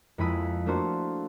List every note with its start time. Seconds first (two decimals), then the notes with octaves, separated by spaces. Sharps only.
0.18 F2 G#3 A#3 E4 B5 D#6
0.66 A3 A#3 D4 F#4 A#4 C5